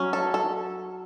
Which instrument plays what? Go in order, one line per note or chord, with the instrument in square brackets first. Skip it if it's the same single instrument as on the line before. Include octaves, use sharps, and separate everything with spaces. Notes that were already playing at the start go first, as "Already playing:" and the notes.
Already playing: [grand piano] F#3 [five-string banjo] C#4
[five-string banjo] A4
A4